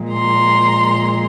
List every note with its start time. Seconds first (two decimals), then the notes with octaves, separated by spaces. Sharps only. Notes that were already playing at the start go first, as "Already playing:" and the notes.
Already playing: A#2 F3 G#3
0.13 A#5 C6